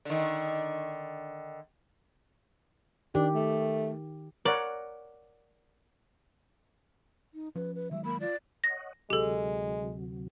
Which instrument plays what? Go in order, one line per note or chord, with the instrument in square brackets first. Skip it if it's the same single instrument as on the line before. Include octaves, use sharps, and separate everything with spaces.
[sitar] D3 D#3
[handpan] D#3 G4 [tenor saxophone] D4
[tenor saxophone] A3
[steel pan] A#4 C#5 F#5 [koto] D5
[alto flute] D#4
[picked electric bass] F3 C#4 [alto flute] B4
[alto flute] B4
[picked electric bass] D#3 F#3 G#3 [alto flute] E5
[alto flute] A#3 [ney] B5
[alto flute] F4 [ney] D5
[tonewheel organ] C#5 D#5 F#5 [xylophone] A#6
[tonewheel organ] D2 C3 F#3 [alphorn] G#3 [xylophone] G4 A4